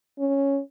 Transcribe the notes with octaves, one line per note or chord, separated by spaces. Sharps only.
C#4